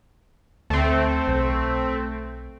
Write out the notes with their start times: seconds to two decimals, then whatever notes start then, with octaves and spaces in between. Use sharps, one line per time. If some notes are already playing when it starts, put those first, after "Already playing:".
0.70 D2 A3 C4
1.28 B1